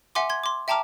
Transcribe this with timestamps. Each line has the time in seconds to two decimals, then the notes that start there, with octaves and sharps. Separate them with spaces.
0.15 E5 F#5 G#5 C6 D6
0.30 C6 G#6
0.44 C6 D6
0.68 E5 G5 A5 A#5 D6 F6